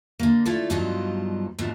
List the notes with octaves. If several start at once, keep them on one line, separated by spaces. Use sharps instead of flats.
D3 A#3
A3 E4 F4 A4 D5
G2 B2 F3 F#3 D#4 F4
F2 G#2 B2 F3 A3 D4